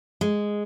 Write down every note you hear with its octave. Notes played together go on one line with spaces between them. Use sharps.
G#3